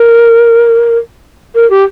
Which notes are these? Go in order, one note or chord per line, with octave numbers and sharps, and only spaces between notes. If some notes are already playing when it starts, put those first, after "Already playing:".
Already playing: A#4
A#4
G4